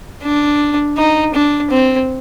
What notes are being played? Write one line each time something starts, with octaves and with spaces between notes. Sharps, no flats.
D4
D#4
D4
C4